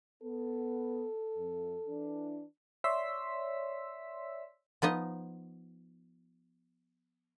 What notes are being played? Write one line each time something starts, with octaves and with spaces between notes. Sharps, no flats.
B3 A4
F2
E3 D4
C#5 D5 E5 C6 E6 B6
F3 B3 D#4 D#5